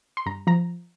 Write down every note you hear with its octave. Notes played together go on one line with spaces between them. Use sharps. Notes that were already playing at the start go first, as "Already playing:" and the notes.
C6
G2 A#5
F3 A#5